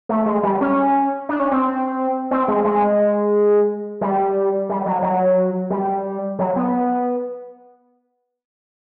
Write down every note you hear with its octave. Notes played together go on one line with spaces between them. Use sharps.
A3
G#3
G3
C#4
D4
C#4
C4
C4
G#3
G#3
G3
G3
F#3
F#3
G3
F#3
B3